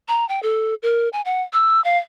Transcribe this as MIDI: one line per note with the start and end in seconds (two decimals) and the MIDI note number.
0.08 0.27 82
0.29 0.40 79
0.43 0.75 69
0.83 1.09 70
1.13 1.21 80
1.25 1.43 78
1.53 1.83 88
1.84 1.98 77